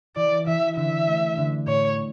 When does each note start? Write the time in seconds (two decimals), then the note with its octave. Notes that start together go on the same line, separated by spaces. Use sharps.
0.16 E3 D5
0.47 E3 E5
0.76 D3 E5
1.07 A3
1.38 D3
1.66 A2 C#5